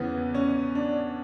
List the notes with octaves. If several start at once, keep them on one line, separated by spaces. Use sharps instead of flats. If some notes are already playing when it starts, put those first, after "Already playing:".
Already playing: E2 C#3 E3 B3
C#4
D4